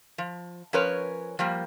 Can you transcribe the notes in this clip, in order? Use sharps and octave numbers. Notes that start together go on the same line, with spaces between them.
F3
F3 C#4 A#4 B4 C#5
F3 G3 A#3